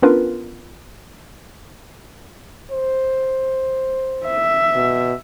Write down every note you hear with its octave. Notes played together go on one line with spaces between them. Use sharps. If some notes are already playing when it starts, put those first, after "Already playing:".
B3 C#4 D4 F4 A#4 B4
C5
E5
B2